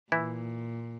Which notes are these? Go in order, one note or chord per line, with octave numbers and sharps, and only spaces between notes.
A#2 E3 E4